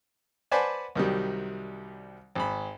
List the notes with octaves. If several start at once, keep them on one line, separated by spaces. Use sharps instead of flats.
B4 C5 D5 F#5 G#5 A5
C2 D#3 F#3 G3
G#1 B5